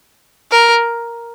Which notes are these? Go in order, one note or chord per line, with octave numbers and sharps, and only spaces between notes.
A#4